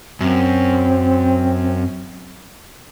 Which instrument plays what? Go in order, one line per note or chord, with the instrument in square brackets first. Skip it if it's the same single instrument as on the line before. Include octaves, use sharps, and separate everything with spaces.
[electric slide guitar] F#2 [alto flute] C4